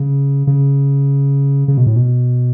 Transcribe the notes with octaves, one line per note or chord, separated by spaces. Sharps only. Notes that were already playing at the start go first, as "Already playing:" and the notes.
Already playing: C#3
C#3
C#3
B2
A2
B2